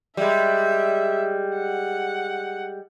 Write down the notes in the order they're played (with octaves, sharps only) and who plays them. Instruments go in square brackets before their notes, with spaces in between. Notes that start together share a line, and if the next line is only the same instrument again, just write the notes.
[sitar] G3 G#3 [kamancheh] E5
[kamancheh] F#5